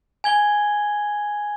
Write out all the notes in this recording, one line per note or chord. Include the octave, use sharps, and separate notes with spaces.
G#5 G#6 G7